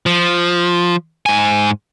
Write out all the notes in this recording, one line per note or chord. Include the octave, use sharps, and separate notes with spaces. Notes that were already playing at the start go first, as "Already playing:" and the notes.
F3
G#2 G#5